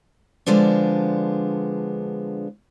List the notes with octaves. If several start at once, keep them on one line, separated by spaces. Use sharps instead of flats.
D3 F3 G#3 B3 D4